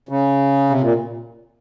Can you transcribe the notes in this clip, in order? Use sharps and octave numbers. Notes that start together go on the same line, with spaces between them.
C#3
C3
A#2